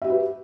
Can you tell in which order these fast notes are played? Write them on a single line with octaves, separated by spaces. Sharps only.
E5 G4 F#4 B4